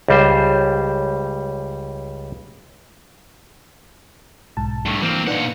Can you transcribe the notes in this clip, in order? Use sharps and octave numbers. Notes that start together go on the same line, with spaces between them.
C#2 G3 C5
B1 G#2 A5
G2 A3
E3 A#3 C4
A#2 D4 D#4 B4 F#5